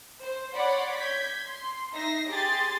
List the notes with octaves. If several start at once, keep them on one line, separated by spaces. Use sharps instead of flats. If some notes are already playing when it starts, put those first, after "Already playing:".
C5
C#5 D5 F#5 B5 C6
G6 G#6 B6
C6
D#4 E5 A#6 C7
G4 G#4 C6 A6